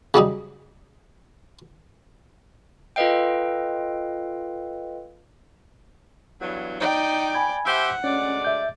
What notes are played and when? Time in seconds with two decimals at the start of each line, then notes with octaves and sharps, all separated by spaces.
0.14 C#3 F#3 G3 D#4
2.96 F4 A4 B4 D#5 F5 G5
6.40 E2 G2 F#3
6.80 D#4 D5 G5
7.34 G#5 B5 G#6
7.65 G4 C5 E5 F#5
8.04 D2 G#3 C#4 D5
8.44 E5 G6